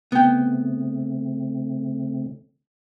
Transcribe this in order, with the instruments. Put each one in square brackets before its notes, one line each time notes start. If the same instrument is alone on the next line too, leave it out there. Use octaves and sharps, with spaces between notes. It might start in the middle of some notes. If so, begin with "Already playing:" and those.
[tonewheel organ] C#3 A3 C4 [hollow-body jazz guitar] B3 G5